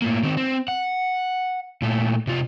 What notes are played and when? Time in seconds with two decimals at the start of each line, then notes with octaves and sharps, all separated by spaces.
0.02 A2 A#3
0.23 D#3 C4
0.37 C4
0.68 F#5
1.82 A#2 A3
2.27 C3 F4